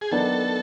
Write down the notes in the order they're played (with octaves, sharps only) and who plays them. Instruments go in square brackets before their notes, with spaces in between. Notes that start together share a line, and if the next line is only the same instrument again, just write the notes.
[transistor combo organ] G#4
[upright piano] D#3 F#3 B3 D4 [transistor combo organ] A4